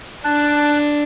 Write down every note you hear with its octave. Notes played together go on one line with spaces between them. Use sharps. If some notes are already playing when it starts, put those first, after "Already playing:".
D4 A5 F#6